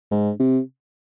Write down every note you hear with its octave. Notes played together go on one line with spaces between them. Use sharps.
G#2
C3